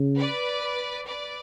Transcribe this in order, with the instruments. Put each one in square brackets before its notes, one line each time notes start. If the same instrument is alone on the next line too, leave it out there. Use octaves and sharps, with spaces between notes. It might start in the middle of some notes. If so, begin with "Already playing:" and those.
Already playing: [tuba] C#3
[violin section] B4 D5
B4 D5